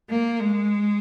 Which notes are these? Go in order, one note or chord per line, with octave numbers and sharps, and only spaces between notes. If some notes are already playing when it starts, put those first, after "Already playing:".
A#3
G#3